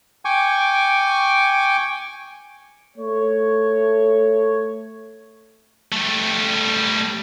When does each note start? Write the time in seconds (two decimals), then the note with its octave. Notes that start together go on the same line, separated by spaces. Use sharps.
0.25 G5 G#5 C#6 D6
2.97 A3 C#5
5.92 G3 A3